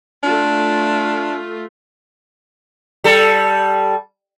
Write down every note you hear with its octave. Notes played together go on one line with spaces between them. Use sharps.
A3 D4 F4
G3 A4